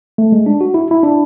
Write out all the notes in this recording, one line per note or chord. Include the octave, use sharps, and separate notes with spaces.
A3
G#3
D4
F#4
E4
E4
D4